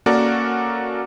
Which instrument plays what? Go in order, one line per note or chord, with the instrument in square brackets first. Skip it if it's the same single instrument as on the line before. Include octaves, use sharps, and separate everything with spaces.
[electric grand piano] A#3 C#4 F#4 A4 A#4 D5